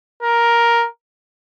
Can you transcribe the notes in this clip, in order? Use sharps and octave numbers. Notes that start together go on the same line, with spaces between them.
A#4